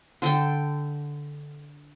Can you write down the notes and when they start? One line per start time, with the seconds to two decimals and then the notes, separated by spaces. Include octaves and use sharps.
0.22 D3 A4 G5